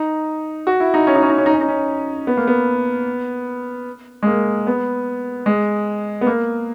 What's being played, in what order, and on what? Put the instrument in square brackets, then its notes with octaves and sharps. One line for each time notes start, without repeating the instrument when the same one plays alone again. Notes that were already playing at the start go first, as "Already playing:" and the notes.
Already playing: [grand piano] D#4
F#4
E4
D#4
C#4
D#4
C#4
D#4
C#4
D#4
C#4
D#4
C#4
B3
A#3
B3
G#3
A#3
B3
G#3
B3
A#3